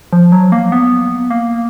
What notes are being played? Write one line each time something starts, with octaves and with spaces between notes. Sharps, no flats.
F3
F#3
A#3
B3
A#3